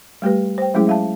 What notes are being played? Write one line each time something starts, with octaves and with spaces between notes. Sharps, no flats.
G3 A3 G4 B4
C5 G5
F#3 G#3 A3 C#4 E4 G#4
E5 F5 A5